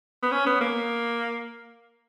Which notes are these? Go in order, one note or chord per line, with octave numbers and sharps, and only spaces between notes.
B3
C#4
B3
A#3